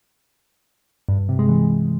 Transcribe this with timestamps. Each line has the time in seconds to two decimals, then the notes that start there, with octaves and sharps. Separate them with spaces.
1.09 G2
1.19 G2
1.29 C3
1.39 G#3
1.49 E3